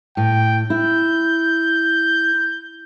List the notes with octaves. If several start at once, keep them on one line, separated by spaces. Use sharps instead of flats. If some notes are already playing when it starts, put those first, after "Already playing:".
A2 G5
E4 G6